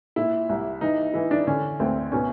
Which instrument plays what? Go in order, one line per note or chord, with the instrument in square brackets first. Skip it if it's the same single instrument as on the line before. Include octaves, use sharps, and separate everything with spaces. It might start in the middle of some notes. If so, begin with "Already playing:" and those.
[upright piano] A#2 E4
C2
E3 D#4
E3 E4
D4
D3 C#4
D2 C4
B2 C#4